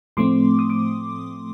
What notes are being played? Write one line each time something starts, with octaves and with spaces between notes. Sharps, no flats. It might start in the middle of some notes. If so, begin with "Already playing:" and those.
A2 F3 A3 C4 C6 D6
D#6
D6